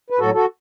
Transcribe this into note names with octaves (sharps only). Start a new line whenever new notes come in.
B4
A2 F#3 F#4 A4
F#4 A4